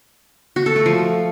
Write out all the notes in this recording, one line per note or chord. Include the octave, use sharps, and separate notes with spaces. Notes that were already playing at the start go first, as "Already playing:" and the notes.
F#4
A4
A3
F3